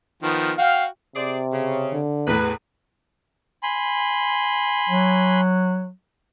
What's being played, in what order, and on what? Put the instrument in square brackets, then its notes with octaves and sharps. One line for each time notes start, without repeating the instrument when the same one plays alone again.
[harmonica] D#3 F3 B3
[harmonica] F#4 G5 [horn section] F5
[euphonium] C3 [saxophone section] G#4 C5 D5
[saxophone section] C#3
[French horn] D3
[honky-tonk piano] E2 A2 [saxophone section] B4
[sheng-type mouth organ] G#5 B5 C6
[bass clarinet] F#3